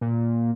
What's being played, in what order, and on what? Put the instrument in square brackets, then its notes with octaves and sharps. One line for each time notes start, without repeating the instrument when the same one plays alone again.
[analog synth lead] A#2